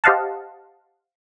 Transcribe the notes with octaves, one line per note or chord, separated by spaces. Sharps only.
G4 C5 D#5 F5 F#5 A5